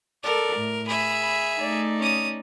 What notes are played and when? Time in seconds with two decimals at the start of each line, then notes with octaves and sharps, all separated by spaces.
0.23 A4 A#4 D5
0.56 A2
0.87 G#4 E5 B5
1.22 B5
1.59 A3 D#4 D5
1.98 C#4 D#6